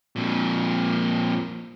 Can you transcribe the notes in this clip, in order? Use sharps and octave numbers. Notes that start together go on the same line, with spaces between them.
F2 A#2